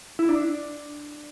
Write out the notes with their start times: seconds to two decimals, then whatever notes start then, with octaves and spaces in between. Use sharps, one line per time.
0.19 E4
0.29 D4